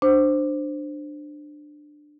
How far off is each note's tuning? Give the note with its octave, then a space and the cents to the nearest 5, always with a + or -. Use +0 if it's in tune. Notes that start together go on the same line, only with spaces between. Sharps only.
D4 +15 C5 +0